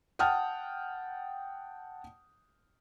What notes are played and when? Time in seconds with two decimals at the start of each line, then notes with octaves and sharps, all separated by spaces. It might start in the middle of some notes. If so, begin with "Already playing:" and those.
0.19 F#5 G5 A5 D#6 F6